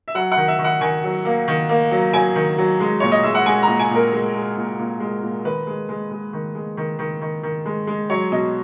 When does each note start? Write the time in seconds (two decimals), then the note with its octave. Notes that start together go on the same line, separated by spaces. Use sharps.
0.08 E5
0.15 F#3 F#5
0.32 F#5
0.37 D#3
0.48 E5
0.59 D#3
0.64 F#5
0.81 D#3 G#5
1.04 F#3
1.25 A#3
1.48 D#3
1.69 A#3
1.91 F#3
2.13 F#3 G#5
2.35 D#3
2.58 F#3
2.80 G#3
3.00 A#2 C#5
3.12 D#5
3.23 G#3 E5
3.35 F#5
3.46 G#3 G#5
3.63 A#5
3.68 A#2
3.79 G#5
3.90 A#2
3.96 A#4
4.13 G#3
4.35 G#3
4.57 A#2
4.79 A#2
5.00 G#3
5.22 A#2
5.45 D#3 B4
5.67 G#3
5.89 G#3
6.11 G#3
6.33 D#3
6.55 G#3
6.77 D#3
6.99 D#3
7.21 D#3
7.43 D#3
7.66 G#3
7.87 G#3
8.10 F#3 C#5
8.32 B2 D#5